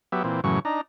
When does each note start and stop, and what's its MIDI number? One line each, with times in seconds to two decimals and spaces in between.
0.12 0.23 54
0.12 0.23 59
0.12 0.23 67
0.12 0.23 76
0.24 0.41 46
0.24 0.41 52
0.24 0.41 60
0.44 0.59 42
0.44 0.59 45
0.44 0.59 49
0.44 0.59 52
0.44 0.59 54
0.44 0.59 85
0.65 0.81 62
0.65 0.81 63
0.65 0.81 82